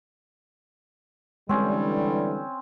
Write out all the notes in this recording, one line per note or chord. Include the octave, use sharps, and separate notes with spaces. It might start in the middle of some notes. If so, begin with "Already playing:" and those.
D3 E3 G3 G#3 C4 C#4